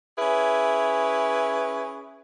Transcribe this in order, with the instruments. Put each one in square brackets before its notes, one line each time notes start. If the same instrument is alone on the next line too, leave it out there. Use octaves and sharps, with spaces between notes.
[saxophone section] C#4 E4 G#4 B4